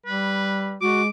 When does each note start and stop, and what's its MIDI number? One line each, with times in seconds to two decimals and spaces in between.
0.06 0.80 55
0.06 0.74 71
0.81 1.08 56
0.81 1.02 66
0.81 1.08 86